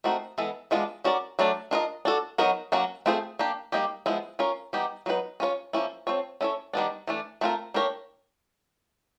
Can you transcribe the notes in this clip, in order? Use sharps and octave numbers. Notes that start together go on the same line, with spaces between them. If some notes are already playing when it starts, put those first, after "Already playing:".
A3 C4 D#4 F#4 A#4
E3 G#3 B3 E4 A4
E3 G#3 B3 D4 F4
C#4 F#4 A#4 D5
F#3 A3 D4
D4 F4 A#4 D#5
D4 F#4 A4
F#3 B3 D#4 F#4 A#4
F#3 A#3 C#4 F#4
A3 C4 F4 G#4 C5
A#3 D4 G4
G3 A#3 D#4 G4
F3 G#3 B3 E4
C#4 F4 A#4 C#5
E3 G3 B3 D#4 G4
F#3 B3 D#4 F#4 B4
C#4 F4 A#4 C#5
F3 A#3 C#4 E4
C4 F4 A4 C#5
C#4 E4 A4 C#5
D#3 G3 B3 D4
E3 A3 D4
A3 C4 F4 A#4
A#3 D4 G4 A#4 C#5